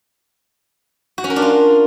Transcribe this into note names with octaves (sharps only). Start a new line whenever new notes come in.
F#4
C#4
A#4
D4
F4